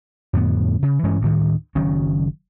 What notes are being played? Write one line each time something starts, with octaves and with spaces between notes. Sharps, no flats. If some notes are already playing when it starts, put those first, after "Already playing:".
F2 A2 D3 B3
C#3
G2 E3 G#3 C#4
D2 A2 D#3
F#1 D#3 F#3 C#4